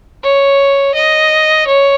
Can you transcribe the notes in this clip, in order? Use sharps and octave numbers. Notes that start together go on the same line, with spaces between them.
C#5
D#5
C#5